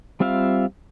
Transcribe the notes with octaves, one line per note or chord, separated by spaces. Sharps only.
G3 C4 F4 E5 F5